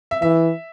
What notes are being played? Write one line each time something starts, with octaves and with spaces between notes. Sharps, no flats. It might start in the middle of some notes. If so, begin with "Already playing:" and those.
E5
E3 E5